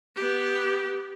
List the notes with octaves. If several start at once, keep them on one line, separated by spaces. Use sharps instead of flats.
B3 G4